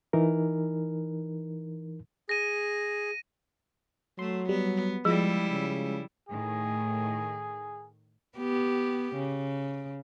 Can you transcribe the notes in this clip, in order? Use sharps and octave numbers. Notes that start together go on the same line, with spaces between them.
E3 D#4 A#4
G#4 A#6 D#7
F#3 A3 C6
G3 B3
F3 G3 G#3 E4 F4 E6
C#3
A2 D#3 G#4
B3 G4
C#3